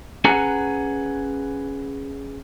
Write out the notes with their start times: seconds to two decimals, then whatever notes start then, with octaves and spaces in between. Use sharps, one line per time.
0.24 C#4 G#4 B4 F#5 G#5 A#5